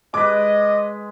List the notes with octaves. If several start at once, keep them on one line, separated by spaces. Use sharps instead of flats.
G#3 B4 D#5 D6